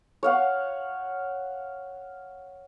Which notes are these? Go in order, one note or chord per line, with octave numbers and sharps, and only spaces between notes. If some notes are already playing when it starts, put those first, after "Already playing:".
C#5 F5 F#5